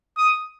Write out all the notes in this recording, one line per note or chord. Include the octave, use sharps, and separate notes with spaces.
D#6